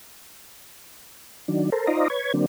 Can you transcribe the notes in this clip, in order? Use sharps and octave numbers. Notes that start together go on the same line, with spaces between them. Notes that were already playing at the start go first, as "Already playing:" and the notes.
D#3 F#3 D4
A4 A#4 C5
D#4 F4 C5 D5 D#5 A#5
B4 C#5 G#6
D3 F#3 A#3 C4 D4